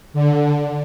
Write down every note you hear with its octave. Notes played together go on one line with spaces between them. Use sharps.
D3